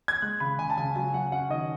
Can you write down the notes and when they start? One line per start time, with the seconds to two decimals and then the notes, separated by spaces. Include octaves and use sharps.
0.08 G#6
0.22 G#3 F#6
0.40 C#3 B5
0.59 C#3 G#5
0.70 A5
0.77 C#3 G#5
0.95 F#3 G#5
1.14 F#3 F#5
1.32 C#4 F#5
1.50 D#3 D#5